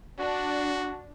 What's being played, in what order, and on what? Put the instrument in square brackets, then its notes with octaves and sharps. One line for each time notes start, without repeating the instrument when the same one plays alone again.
[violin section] D4 [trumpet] F#4